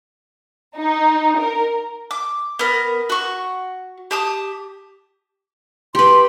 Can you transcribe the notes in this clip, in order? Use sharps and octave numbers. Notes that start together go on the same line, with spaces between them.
D#4
A#4
D6
B3 A#4
F#4 C#6
G4 A5 D#6
G4 B4 C6